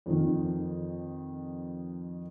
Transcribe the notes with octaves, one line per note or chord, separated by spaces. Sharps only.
F2 D#3